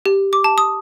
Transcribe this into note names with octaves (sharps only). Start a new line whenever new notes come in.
G4
D6
A5
D#6